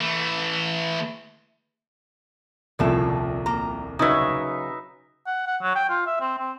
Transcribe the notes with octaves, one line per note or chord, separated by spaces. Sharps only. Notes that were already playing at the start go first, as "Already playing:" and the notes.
E3 A3
D#1 C2 A2 C#3 F3 A4
A#3 A#5
C#3 F#3 D#4 B4 E5
F#5
F#5
F#3
G5
F4
E5
C4
C4